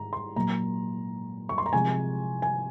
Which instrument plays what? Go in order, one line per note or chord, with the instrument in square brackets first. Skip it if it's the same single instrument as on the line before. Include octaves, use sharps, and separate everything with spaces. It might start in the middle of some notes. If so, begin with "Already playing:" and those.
Already playing: [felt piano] G#2 A#5
C6
A#2 F#3 A#5
C#6
C6
A#5
C3 F3 G#3 G#5
G#5